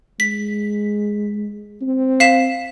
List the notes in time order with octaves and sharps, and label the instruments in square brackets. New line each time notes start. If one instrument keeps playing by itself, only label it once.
[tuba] G#3 [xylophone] B6
[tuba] C4
[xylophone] F5 B6 E7